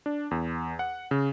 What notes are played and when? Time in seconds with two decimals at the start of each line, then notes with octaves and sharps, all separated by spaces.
0.06 D4
0.31 E2
0.79 F#5
1.11 C#3